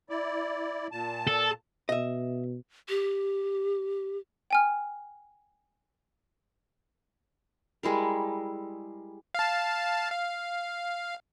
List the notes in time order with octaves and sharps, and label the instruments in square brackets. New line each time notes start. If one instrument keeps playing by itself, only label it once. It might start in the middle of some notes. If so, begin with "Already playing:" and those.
[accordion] E4 D5
A#2 A5
[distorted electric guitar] A4
[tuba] B2 [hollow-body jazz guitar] D#5 E5
[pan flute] G4
[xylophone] G5 G#5 F6
[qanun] G3 G#3 E4 A#4
[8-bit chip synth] F5 A5
F5